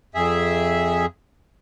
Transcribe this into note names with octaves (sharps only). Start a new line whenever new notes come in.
F2 G#4 E5